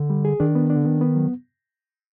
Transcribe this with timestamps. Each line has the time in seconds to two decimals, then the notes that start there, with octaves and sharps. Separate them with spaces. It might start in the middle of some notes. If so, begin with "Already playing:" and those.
Already playing: D3
0.10 G3
0.25 G#4
0.40 D#3 D4
0.55 B3
0.70 D4
0.76 D3
0.85 D#3 B3
1.01 B3
1.15 F#3